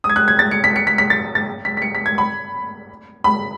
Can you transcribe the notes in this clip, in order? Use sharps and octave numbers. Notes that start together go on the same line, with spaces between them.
D#6
G#6
F#6
G#6
A6
C#7
B6
C#7
B6
B6
A6
A6
B6
B6
C#7
B6
G#6
B5
B5